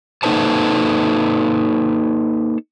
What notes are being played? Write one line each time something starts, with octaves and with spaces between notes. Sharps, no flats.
A#3 D#4 A4 B4 C5 A5